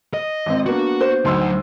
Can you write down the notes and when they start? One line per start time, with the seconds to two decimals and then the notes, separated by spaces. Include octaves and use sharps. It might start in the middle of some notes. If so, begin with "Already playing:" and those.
0.14 D#5
0.46 G#1 C4
0.66 A#3 B3 D4 F#4
1.01 C5
1.25 D2 F#3 D#4 C6 E6